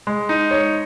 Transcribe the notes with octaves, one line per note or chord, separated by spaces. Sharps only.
G#3
D#4
C#5